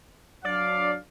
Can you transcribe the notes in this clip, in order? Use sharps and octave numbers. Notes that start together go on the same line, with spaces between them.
F#3 D4 D5 F5